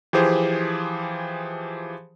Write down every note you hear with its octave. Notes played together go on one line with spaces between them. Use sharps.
E3 F3 G4 G#4 C5